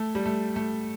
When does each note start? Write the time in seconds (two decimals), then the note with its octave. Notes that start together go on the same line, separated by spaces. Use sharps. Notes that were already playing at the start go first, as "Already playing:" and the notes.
Already playing: A3
0.15 G3
0.26 A3
0.56 A3